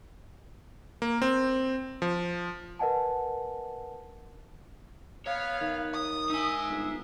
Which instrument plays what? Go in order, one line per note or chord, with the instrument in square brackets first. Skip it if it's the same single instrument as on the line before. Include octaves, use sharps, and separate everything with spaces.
[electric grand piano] A#3
C4
F3
[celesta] A#4 B4 D#5 F#5 G#5 A5
[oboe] B3 [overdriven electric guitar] C#5 [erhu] F5
[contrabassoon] D#3
[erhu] D#6
[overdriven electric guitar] D#4 G#5 [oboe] E5
[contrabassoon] G1